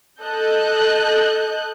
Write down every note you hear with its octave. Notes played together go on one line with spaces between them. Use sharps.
A4 D#5 A5 F#6 G6